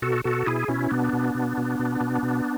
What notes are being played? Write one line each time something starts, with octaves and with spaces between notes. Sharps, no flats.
B2 F#4 A4
B2 F#4 A4
B2 E4 G#4
B2 C#4 E4
B2 B3 D4
B2
B2
B2
B2
B2
B2